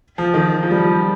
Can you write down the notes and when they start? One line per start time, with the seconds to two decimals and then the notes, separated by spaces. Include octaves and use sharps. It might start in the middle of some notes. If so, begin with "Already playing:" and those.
0.18 F3
0.34 D#3
0.63 F3
0.71 G3
0.78 F3